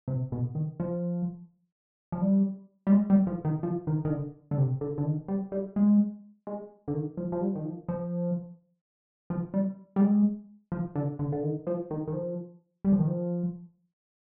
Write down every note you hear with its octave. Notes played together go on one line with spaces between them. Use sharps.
C3
B2
D#3
F3
F3
G3
G3
G#3
G3
F3
D#3
F3
D#3
D#3
D3
D3
C3
D3
D3
D#3
G3
G3
G#3
G#3
D3
D#3
F3
F3
G3
D#3
F3
F3
F3
G3
G3
G#3
F3
D3
D3
D3
D#3
F3
D#3
D#3
F3
G3
F3
D#3
F3